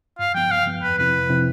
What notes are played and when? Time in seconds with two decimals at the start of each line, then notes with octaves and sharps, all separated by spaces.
0.19 G2 F5
0.35 F3 B3 G5
0.51 G2 F5
0.66 F3 B3
0.82 F2 B4
0.98 C3 F3 C4 E4 B4
1.14 F2
1.29 C3 F3 C4 E4